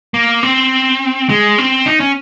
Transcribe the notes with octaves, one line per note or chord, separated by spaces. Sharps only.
A#3
C4
G#3
C4
D#4
C#4